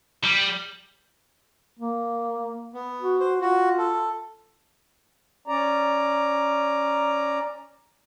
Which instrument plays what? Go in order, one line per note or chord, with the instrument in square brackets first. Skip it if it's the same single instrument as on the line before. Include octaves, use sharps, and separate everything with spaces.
[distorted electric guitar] G3
[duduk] A#3
[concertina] B3
[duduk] F#4
[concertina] C5
[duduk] F4 [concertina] F#4
[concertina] A4
[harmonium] C#4 D5 A#5